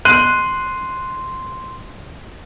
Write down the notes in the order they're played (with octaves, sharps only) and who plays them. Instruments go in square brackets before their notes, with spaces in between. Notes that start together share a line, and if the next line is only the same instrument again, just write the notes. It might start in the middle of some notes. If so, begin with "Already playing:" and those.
[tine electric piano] C6 [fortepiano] F#6 [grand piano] D#7